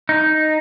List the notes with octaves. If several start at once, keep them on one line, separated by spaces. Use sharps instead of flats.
D#4